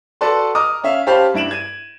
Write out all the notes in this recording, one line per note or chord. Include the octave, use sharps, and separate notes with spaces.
F#4 A4 B4 D5 A5 C6
D#5 A#5 D6 D#6 F6
C#4 E5 F5
C#4 G4 C5 F5 A5 B5
G2 E4 D7 E7 F#7
G#6 D#7